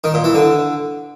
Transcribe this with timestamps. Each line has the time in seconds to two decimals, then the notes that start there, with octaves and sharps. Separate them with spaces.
0.04 D#3
0.14 A#2
0.24 E3
0.34 D3